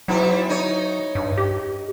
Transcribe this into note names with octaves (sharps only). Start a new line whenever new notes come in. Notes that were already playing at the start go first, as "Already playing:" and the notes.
G#2 B2 F#3 E4
D#4 C#5
G2
G4